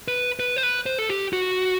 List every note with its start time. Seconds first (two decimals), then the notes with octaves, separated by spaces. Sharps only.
0.08 B4
0.40 B4
0.56 C5
0.63 B4
0.86 C5
0.98 A4
1.09 G4
1.33 F#4